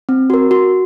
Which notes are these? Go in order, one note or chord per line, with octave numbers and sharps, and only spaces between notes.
C4
F#4 A#4
F#4